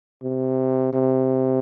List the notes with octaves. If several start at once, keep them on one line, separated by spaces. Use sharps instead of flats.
C3
C3